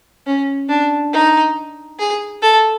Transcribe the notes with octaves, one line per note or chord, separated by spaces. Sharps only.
C#4
D4
D#4
G#4
A4